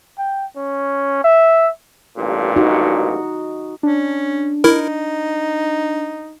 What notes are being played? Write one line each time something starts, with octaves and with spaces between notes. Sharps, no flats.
G5
C#4
E5
A1 G2 A#2
D#4 F#4
C#4 D4
D#4 E4 A#4